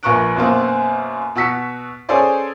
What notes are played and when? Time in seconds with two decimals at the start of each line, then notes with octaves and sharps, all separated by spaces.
0.03 A#1 A#4 B4 C#6 F#6 D7
0.36 F#2 B2 A#3 C4
1.35 B2 F#4 E6 B6 C#7
2.09 C#4 G#4 A4 C5 D5 G#5